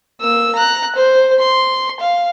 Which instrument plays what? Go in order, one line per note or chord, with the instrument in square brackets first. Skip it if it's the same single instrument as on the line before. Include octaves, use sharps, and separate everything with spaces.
[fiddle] A#3 E6
A#5 F#6
C5
C6
F5